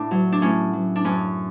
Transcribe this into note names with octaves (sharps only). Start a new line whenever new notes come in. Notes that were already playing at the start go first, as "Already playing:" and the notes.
Already playing: A2 D4
F#3
D4
A2 C#4
F#3
D4
F#2 C#4